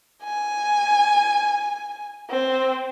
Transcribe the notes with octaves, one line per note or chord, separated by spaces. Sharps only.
G#5
C4